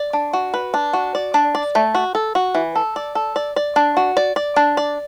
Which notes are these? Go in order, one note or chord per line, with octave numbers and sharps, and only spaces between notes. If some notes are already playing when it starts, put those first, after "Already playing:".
Already playing: D5
D4
F#4
B4
D4
F#4
D5
D4
D5
A3
F#4
A4
F#4
E3
A4
D5
A4
D5
D5
D4
F#4
D5
D5
D4
D5